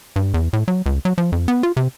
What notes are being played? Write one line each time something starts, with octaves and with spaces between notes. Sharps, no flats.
G2
E2
A2
F#3
C#2
F#3
F3
F2
B3
F4
C3